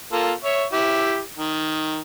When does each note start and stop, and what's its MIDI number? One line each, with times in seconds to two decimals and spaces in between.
0.12 0.32 58
0.12 0.32 65
0.12 0.32 69
0.45 0.64 73
0.45 0.64 76
0.73 1.19 64
0.73 1.19 67
1.37 2.01 51